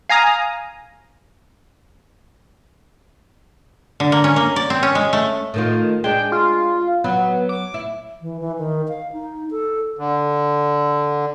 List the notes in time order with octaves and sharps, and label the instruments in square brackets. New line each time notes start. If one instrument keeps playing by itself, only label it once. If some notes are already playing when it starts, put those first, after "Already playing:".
[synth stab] F5 G#5 A#5 D#6
[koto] D3
A#3
C#4
A#3
D5
C4
C#4
G#3
A3
[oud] A2 D#3 F4
[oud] G#3 D4 [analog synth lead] G5
[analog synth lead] F4
[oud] F#3 [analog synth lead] B3
[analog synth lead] D6
[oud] E4
[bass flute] E3
E3
D#3
F5
D#4
A4
[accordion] D3